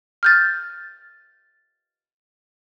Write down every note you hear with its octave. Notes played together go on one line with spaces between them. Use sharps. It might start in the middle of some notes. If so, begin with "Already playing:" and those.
F6 G6 A6